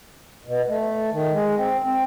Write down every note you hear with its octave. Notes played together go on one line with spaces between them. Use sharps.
B2
A3
D#3
G#3
C4
C4